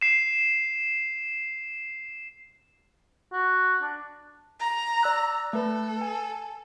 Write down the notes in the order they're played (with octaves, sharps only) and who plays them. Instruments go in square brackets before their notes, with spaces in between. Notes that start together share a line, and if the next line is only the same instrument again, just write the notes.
[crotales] C7 E7
[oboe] F#4
D4
[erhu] A#5
[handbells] D5 E6 F#6
[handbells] A3 B4 [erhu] A4
[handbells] G#5